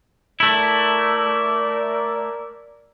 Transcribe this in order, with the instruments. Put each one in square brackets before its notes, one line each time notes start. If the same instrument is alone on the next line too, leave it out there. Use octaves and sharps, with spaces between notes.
[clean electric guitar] A3 E4 [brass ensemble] A#4 D5